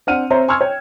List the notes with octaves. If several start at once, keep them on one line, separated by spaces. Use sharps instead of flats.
C4 D4 F#5 F6 D#7
C4 C5 C#5 E5 A#5
G#5 C6 C#6 E6 F6 G#6
C#5 G5